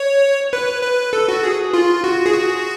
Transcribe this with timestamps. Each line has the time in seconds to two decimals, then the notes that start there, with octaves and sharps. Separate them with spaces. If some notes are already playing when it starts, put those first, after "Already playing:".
Already playing: C#5
0.53 B4
0.83 B4
1.13 A4
1.28 F#4
1.43 G#4
1.73 F4
2.04 F#4
2.26 G#4
2.34 F#4